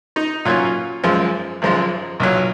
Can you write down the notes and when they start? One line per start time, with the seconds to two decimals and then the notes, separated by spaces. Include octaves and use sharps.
0.16 D#4
0.45 A#2 F#3 A#3 C#4 F4
1.04 G#1 F#2 F3 G#3
1.62 G#1 F#2 F3 G#3
2.20 B1 A#2 F#3